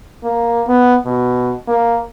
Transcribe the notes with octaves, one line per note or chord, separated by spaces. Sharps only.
A#3
B3
B2
A#3